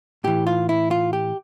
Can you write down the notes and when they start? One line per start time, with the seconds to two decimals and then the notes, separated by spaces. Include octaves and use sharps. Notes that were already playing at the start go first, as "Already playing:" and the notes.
0.24 A2 E3 G4
0.47 F4
0.69 E4
0.91 F4
1.13 G4